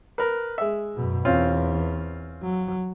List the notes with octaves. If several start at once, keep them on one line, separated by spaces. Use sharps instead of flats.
A#4 B4
G#3 E5
F#2 B2
E2 C4 C#4 F4
F#3